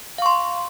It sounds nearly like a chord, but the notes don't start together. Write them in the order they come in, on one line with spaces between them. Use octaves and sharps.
F5 C#6 C6